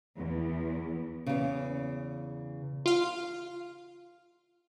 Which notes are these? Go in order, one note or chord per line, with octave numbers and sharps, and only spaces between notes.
E2
E2 C#3
F4 F5